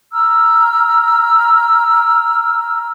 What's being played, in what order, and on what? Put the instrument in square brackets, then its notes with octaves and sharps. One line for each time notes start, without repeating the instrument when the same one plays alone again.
[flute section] A#5 E6 F6